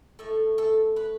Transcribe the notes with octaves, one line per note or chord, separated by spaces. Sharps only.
A2 A3 A4
A4
B4